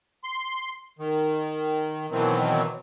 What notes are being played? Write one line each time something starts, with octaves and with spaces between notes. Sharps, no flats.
C6
D#3
B2 D#3 E3 F#3 C4